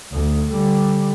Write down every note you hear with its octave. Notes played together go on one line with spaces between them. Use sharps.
D2
D3 G3